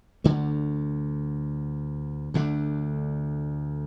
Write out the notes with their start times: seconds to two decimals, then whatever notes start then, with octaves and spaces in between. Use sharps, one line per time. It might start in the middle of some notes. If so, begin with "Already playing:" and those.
0.24 D2 D3 A3
2.34 D2 D3 A3 D4